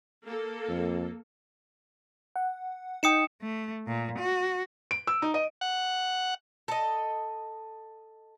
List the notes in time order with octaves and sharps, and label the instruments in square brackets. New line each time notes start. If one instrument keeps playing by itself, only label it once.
[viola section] A#3 A4
[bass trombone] F2
[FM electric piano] F#5
[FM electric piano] D#4 G5 [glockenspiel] D#6 C#7 E7
[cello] A3
A#2
F#4
[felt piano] D7
E6
D#4
D#5
[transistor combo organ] F#5
[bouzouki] A4 D#5